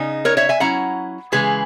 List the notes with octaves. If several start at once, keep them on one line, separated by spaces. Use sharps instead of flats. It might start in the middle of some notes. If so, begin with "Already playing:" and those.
Already playing: C#3 D#4
A#4 C#5
C#5 E5
E5 G#5
F#3 C#4 E4 F#5 A#5
C#3 E3 G#3 G#4 B4